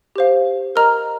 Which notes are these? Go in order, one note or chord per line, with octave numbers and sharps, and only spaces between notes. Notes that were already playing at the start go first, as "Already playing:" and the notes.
G4 C5 F5
A#4 D#5 A#5 F6